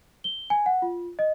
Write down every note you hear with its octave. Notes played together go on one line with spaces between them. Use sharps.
G7
G#5
F#5
F4
D#5